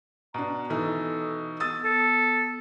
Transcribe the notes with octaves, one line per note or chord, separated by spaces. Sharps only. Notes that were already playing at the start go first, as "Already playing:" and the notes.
B2 D4 A#5
B2 E3 D#4 A4
B3 D#6 E6 A6
A4